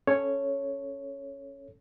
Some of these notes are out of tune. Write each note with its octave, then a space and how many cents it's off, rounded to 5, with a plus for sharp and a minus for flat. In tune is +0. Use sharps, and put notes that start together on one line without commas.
C#4 -5 A4 +0 C#5 +0